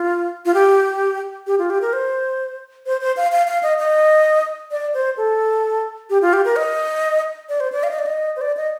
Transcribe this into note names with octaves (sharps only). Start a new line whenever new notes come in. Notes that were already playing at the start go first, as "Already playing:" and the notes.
Already playing: F4
F4
G4
G4
F4
G4
A#4
C5
C5
C5
F5
F5
F5
D#5
D#5
D5
C5
A4
G4
F4
G4
A#4
D#5
D5
C5
D5
F5
D#5
D5
D#5
C5
D5
D#5